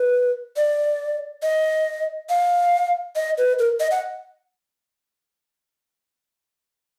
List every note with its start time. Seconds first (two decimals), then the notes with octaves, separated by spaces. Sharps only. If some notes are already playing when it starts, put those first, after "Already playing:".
Already playing: B4
0.57 D5
1.43 D#5
2.30 F5
3.16 D#5
3.38 B4
3.59 A#4
3.80 D#5
3.91 F#5